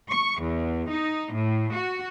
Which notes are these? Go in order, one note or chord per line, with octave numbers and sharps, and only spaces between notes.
C#6
E2
D#4
A2
F#4